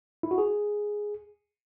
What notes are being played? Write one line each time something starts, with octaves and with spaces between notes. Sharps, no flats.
E4
F#4
G#4